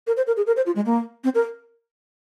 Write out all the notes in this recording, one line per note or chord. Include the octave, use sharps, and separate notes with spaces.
A#4
C5
A#4
G#4
A#4
C5
F4
G#3
A#3
C4
A#4